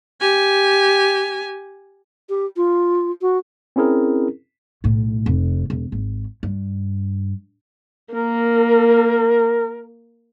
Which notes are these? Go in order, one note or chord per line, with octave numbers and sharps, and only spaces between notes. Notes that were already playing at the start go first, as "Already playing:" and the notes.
G4 G#5
G4
F4
F#4
C4 C#4 E4 G#4 A#4
B1 A2
F1
E1
G#1
G2
A#3 A#4